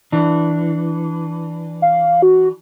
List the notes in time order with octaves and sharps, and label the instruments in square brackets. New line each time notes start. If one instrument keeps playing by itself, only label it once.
[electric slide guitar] E3 D4
[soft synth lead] F5
F#4